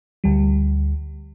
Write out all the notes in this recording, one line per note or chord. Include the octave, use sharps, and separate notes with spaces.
D2 G3